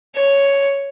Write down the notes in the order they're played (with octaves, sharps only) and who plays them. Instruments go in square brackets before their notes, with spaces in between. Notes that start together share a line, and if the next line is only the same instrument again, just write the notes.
[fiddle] C#5